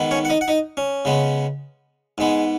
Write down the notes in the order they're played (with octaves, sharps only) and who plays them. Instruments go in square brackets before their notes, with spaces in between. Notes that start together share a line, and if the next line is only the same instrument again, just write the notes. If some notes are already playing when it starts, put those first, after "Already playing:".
Already playing: [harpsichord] G#2 D#3 B3
C#4 C#5
F#5
D#4 D#5
F#5
D#4 D#5
C#4
C#3 G#3 B3
G#2 G#3 B3